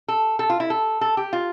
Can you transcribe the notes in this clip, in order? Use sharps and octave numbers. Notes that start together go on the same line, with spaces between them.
A4
A4
F4
E4
A4
A4
G4
F4